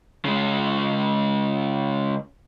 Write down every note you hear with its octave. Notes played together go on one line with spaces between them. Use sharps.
C#3 G#3